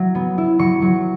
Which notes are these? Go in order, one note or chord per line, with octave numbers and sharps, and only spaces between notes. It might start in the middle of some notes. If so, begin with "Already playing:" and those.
Already playing: F#3 E4
B3
E4
F#3 C#6
F#3